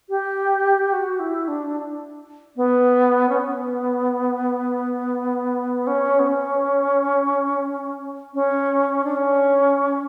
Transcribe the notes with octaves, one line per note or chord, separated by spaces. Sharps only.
G4
F#4
E4
D4
B3
C#4
B3
C#4
B3
C#4
C#4
D4
C#4